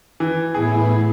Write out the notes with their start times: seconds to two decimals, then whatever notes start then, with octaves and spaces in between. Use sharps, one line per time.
0.20 E3
0.55 A2 B3 E4 G#4